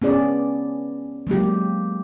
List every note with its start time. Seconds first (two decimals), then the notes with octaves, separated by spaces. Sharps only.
0.02 B3 C#4 G#4 D5
1.27 F#3 G#3 A#3 G4